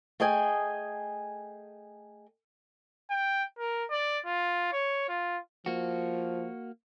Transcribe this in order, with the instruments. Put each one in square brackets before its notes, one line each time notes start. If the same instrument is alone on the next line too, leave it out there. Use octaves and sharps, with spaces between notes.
[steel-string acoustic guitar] A3 G#4 D#5 G5 G#5
[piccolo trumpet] G5
A#4
D5
F4
C#5
F4
[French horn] F3 [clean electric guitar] A#3 F#4